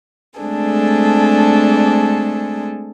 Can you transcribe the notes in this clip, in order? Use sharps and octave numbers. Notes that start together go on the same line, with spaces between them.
G#3 A3 C4 D4 G#4 A4